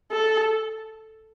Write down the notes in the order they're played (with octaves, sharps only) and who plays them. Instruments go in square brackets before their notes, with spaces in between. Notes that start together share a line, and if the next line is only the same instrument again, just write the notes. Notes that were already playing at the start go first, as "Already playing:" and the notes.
[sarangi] A4